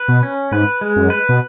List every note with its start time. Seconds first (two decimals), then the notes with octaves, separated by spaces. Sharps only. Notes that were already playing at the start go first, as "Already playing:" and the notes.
Already playing: B4
0.08 B2
0.23 C#4
0.52 G#2 B4
0.81 G#3
0.96 F#2
1.10 B4
1.29 B2